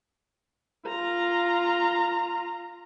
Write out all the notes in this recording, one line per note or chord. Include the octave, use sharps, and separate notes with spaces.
F4 A#5